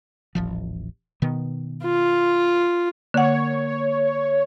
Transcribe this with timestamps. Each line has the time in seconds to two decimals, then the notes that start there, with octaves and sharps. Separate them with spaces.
0.35 D#1 A1 F3
1.22 B2 D#3 B3
1.83 F4
3.14 D3 A#3 C#5 F#5